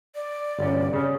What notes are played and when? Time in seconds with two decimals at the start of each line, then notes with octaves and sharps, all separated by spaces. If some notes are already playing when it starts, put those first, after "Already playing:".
0.15 D5
0.59 G1 C#4
0.93 C#3 C#4